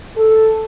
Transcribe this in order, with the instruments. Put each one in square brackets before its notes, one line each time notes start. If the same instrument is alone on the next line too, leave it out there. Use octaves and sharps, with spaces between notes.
[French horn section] A4